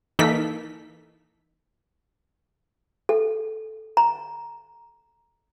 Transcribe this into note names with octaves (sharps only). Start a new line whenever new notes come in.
E3 A#3 D#4 A4 E6 B6
A4
A#5